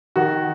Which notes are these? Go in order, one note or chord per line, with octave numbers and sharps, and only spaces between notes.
D#3 F#4